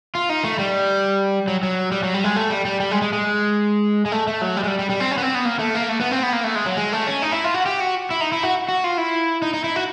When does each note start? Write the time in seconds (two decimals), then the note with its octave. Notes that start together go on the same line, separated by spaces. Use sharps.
0.15 F4
0.29 D#4
0.44 A3
0.59 G3
1.48 F#3
1.63 F#3
1.92 G3
2.03 F#3
2.14 G3
2.24 G#3
2.36 A3
2.50 G3
2.65 G3
2.80 G3
2.91 G#3
3.02 G#3
3.13 G#3
4.06 G#3
4.12 A3
4.27 A3
4.41 F#3
4.57 G3
4.63 G#3
4.68 G3
4.79 G3
4.90 G3
5.00 C4
5.11 C#4
5.18 B3
5.22 C4
5.34 B3
5.45 A#3
5.59 A3
5.75 A#3
5.89 A3
6.00 B3
6.11 C4
6.23 B3
6.33 A#3
6.44 A3
6.55 G#3
6.66 F#3
6.77 G#3
6.92 A3
7.07 C#4
7.22 D#4
7.32 E4
7.44 F4
7.54 F#4
7.66 G4
7.80 F#4
8.11 E4
8.21 D#4
8.32 E4
8.43 F#4
8.69 F#4
8.84 F4
8.98 E4
9.42 D#4
9.54 D#4
9.64 E4
9.76 F#4